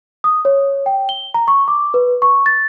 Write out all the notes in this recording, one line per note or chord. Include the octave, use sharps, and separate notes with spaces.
D#6
C#5
G5
G7
A#5
C#6
D6
B4
C#6
A6